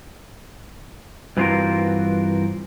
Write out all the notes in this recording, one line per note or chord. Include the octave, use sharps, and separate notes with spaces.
G2 E3 C4 F4 F#4 A#4